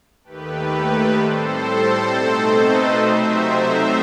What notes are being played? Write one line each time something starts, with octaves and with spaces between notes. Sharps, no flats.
D#2 D#3 A3 G4 B4
G4 B4
A2 G3 C4 A4 C5
B2 A3 C4 D#4
B4 D#5
C3 F#3 A3 C4 D#4 C5 E5
C5 E5